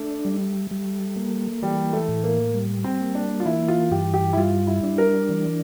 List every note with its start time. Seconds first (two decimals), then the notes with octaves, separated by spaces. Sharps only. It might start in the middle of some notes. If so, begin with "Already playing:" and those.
Already playing: A3 D4
0.25 G3
0.71 G3
1.16 A#3
1.62 E3 G3
1.93 A3
2.08 A2
2.24 A#3
2.54 G3
2.84 C4
3.00 A#3
3.15 D4
3.40 F4
3.46 E3 E4
3.68 F4
3.91 G2 G4
4.14 G4
4.33 E4
4.37 G3 F4
4.67 E4
4.84 D4
4.98 A#4
5.29 E3